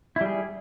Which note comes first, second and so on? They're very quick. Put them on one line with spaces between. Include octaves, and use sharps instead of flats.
E4 G3 G#4